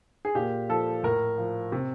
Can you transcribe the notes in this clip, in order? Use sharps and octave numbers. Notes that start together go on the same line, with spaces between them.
G#4
A#2 G4
F3 A4
A2 A#4
F3
C3